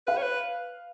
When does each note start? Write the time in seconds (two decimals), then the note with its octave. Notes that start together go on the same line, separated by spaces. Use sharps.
0.07 B4 F5
0.17 C#5
0.23 B4